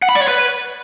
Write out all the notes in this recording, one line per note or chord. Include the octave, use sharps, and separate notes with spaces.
F#5
B5
D5
C#5
B4